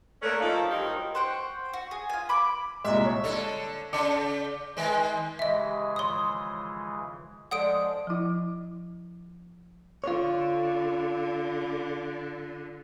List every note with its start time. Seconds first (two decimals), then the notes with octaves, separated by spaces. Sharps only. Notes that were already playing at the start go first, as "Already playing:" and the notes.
0.22 A3 A#3 C#4 B4 C#5 D5
0.40 F3 A3 A#3 D#4
0.70 G2 F3 F#3 D#4 G4 A#4
1.15 C5 F#5 G5 C#6
1.73 F#4
1.91 G#4
2.10 F4 G#5
2.29 B5 D6
2.84 C2 A#2 G#3 E5
3.05 C#5
3.24 D3 A4
3.93 C#3 D6 C#7
4.77 D#3 G#3
5.39 C#3 E3 G#3 G4 D#5 E5
5.96 D#3 F3 C#5 C6 D#6
7.51 F3 G#3 D4 A4 D5 F#5 D#6 D7
8.07 F3 E4
10.04 D3 F4 C#5